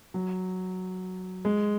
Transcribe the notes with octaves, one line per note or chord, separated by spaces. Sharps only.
F#3
G#3